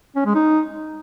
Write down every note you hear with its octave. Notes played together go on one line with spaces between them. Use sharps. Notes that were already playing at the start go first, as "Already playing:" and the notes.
C#4
G#3
D#4